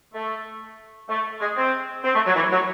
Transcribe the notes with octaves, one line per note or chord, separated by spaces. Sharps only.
A3
A3
G#3
C4
C4
A3
F#3
E3
F#3